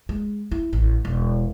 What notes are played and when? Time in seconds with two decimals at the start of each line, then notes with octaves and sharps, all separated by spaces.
0.09 G#3
0.51 E4
0.73 A1
1.05 E1